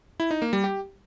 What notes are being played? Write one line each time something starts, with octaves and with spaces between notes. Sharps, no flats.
E4
D#4
A#3
G3
G4